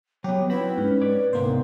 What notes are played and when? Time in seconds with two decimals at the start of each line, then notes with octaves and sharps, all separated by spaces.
0.24 F#3 B3 G4 C#5
0.50 C4 E4 F#4 B4 B5
0.78 G#2 C#4
1.01 C#5 D5
1.33 D2 G#2 C3 A#3 B3 C5